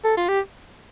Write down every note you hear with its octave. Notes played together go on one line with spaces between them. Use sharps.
A4
F4
G4